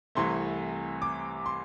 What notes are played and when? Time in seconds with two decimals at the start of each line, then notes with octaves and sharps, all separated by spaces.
0.15 C2 C3 E3 A3 C6
1.02 D6
1.46 C6